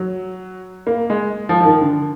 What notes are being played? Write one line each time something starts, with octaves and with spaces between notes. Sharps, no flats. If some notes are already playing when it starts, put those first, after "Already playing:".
Already playing: F#3
A#3
G#3
F3
F3
D#3
D3